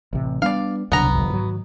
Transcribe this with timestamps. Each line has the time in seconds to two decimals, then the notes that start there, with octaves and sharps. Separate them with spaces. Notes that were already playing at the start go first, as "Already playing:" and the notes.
0.13 A1 C3
0.42 G3 B3 D4 D5 F5
0.92 D#1 C2 C#3 F#3 B3 D4 A#5
1.12 G1 F2
1.30 G#2 D#3 F3 F#3